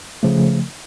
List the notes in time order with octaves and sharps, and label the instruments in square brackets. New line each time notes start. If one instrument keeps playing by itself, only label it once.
[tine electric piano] C#3 F3 A3